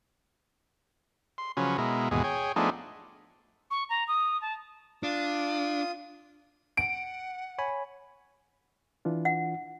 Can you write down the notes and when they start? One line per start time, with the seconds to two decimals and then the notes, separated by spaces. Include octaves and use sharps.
1.38 C6
1.57 C#3 F3 F#3 C#4 B4
1.78 B2 G#3 E4 A#4
2.11 D#2 G#2 B2 E3 G#4
2.24 G#4 C#5 G5
2.56 F3 A3 B3 D4 D#4 G#4
3.71 C#6
3.89 A#5
4.08 D#6
4.42 A5
5.03 D4 F4 D#6
6.77 F#5 D7
7.58 C#5 G#5 B5
9.05 E3 D4 F4
9.25 F#5